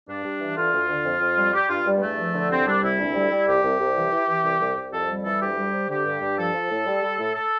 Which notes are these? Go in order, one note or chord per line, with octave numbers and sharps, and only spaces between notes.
G2 D4
G2
E3
D3 F4
D2
D3
F2
F2
G3
G3 G4
G2 F4
G2 G3
B3
E2 A3
F3
D3
C2 C4
G3 D4
C2 E4
D2
G3
G3
C2 G4
C2
C2
E3
E3
E3
C2
C2
C2
F2 A4
G3
E3 A4
D2 G4
G3
C3
D3 G4
G2
G2
F3 A4
F3
A2
G3
G3
A2
A4